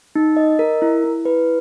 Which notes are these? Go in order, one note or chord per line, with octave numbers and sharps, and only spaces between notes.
D#4
D#5
A#4
E4
E4
B4